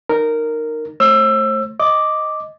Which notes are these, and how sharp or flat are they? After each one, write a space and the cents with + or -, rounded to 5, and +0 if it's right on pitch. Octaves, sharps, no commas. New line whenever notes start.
D#4 -20 A#4 -10
A3 +0 C5 +40 E6 +20
D#5 +0 D6 +0